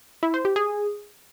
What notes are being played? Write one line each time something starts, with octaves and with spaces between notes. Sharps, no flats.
E4
C5
G4
G#4